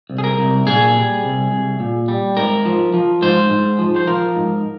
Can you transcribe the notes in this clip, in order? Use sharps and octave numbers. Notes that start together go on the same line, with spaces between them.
C2
G#4
A#4
C2
A#2 G#4
G3
C2
C2
A#2
G3
G#2 A#4
F3
F3
G#2 C5
G#2
F3
C5
F3 A#4
G#2